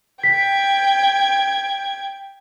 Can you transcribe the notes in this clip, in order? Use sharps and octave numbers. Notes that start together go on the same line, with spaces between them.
G5 G#6 B6